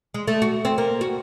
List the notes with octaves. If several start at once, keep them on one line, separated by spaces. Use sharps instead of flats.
G#3
A3
F#4
C4
A#3
F#4